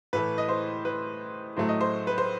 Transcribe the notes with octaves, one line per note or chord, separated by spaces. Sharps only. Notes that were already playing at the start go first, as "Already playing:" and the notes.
A2 E3 A3 B4
D#5
C5
B4
A2 F#3 A3 C5
D#5
C5
B4
C5